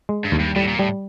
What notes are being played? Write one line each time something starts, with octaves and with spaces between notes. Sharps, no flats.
G#3
G2
D#2
G2
A2 G3
A#2
A2 G3